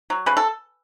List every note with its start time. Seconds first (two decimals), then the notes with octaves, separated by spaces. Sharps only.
0.10 F#3
0.26 C#3 B4
0.37 A4